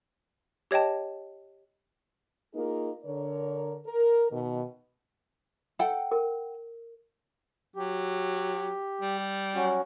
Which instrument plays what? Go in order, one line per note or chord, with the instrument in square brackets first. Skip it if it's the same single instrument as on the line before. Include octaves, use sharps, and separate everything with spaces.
[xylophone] G4 C#5 D#5 G5 A5
[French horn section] A#3 D#4 F4 G#4 A#4
D3 A#4 C#5
A#4
B2 D#3
[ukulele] A4 F#5 G5
[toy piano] A#4
[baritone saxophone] F#3 [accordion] G4
[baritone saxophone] G3
[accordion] F#3 C#4 F#4